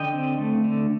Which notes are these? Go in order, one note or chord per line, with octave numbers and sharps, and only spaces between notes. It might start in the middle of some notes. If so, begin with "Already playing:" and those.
Already playing: D3 D#5 G5
C4
A3
D3